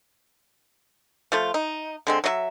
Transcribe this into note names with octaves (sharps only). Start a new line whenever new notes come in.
F3 A3 F4
D#4
D3 G#3 C4
F#3 D#4 E5